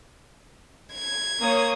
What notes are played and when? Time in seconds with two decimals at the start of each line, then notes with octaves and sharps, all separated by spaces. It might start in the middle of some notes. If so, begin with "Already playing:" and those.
0.94 G#6
1.39 A#3 C#5 D#6